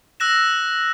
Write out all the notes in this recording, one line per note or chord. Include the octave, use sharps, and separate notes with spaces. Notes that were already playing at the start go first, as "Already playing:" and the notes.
E6 F#6 A#6 E7